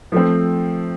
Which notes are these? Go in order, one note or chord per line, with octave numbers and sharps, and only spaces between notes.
F3 A3 C4